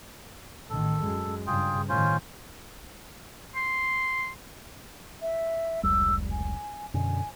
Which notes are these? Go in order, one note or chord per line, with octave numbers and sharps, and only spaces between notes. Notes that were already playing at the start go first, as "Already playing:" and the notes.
A1 D#3 A4
F#2 G#3
G2 C#3 F4 G#4 G5
A2 D#3 C#4 F4 C5
C6
E5
F1 C#2 G3 E6
G#5
F#2 B2 D3 G#5